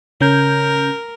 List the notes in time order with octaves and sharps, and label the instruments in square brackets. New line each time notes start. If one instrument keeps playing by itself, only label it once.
[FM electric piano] C#3 C#4 G6 [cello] A#4